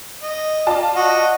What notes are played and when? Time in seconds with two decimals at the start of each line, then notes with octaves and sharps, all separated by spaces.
0.22 D#5
0.67 F4 D5 A5
0.95 F#4 D#5